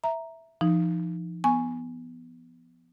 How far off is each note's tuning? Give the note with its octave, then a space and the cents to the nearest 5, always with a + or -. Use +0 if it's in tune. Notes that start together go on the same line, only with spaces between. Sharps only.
E5 +0 A#5 +0
F3 -30 D#4 +0
B3 +0 G#5 +0 C#6 +0